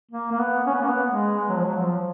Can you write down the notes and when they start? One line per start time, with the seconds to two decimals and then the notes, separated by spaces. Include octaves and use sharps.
0.11 A#3
0.32 A#3
0.39 B3
0.67 C#4
0.74 B3
0.81 A#3
0.89 B3
1.09 G#3
1.49 F#3
1.57 F3
1.64 F#3
1.77 F3